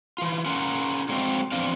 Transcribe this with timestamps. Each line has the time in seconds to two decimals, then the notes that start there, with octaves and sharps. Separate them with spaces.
0.18 E3 F4
0.46 C#4 F4 A#4 F#5
1.09 D3 F#3 G#3 C4 D#5 F5
1.52 E2 F3 C4 D4 F5